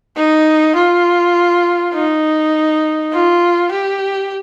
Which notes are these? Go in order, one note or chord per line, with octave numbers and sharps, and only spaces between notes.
D#4
F4
D#4
F4
G4